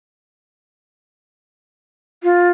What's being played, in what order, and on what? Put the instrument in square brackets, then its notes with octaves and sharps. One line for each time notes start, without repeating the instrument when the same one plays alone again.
[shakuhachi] F4